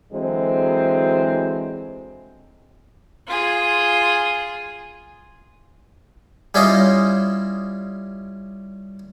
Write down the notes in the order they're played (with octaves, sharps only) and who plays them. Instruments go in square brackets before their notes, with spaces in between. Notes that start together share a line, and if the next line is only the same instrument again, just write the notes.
[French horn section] D3 E3 F#3 G#3 C4
[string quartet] F4 G#4
[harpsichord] G3 C#4 E4 F4 D#5